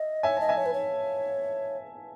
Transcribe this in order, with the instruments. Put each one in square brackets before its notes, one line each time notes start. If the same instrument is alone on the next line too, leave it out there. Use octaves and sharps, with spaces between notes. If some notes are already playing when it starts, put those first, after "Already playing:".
Already playing: [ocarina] D#5 [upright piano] E5
[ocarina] C#5 [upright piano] E5 G#5
[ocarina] D#5 [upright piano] A5
[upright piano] E5 G#5
[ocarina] C#5
B4
C#5